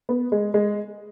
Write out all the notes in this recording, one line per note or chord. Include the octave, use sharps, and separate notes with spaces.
B3
G#3
G#3